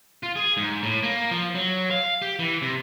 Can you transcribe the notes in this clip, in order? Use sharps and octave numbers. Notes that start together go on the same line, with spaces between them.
F4
G#4
G#2
A2
A#3
F3
F#3
F5
G4
E3
C3